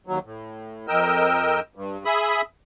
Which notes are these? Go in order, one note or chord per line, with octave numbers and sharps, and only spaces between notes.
D#2 F#3
A2
F2 A#4 D#5 G5 E6
G2
G#4 E5 B5 D#6